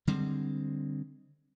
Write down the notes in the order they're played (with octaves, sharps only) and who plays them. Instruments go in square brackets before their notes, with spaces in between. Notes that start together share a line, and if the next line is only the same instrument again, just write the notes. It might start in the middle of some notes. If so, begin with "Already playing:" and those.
[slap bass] D3 G3 G#3 C4